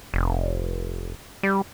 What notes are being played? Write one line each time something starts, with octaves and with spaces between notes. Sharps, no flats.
F1
G3